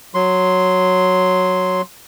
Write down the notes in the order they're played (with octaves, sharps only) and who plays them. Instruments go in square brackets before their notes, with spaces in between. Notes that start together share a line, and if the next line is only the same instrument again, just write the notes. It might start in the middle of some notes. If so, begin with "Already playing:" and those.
[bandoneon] F#3 C6